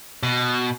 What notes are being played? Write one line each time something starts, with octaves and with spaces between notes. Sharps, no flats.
B2